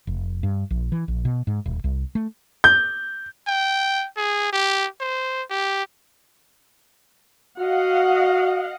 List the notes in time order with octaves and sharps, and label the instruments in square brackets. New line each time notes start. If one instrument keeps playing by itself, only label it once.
[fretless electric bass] F1
G2
A#1
E3
A#1
B2
G#2
D#1
C2
A3
[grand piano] G6
[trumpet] G5
G#4
G4
C5
G4
[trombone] F#4 [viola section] D#5 F5 F#5